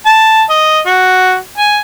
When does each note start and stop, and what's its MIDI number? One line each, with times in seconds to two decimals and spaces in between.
0.06 0.43 81
0.50 0.80 75
0.86 1.36 66
1.58 1.79 80